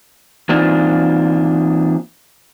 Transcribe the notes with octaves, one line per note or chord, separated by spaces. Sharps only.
E3 A#3 C4 D4 D#4 F4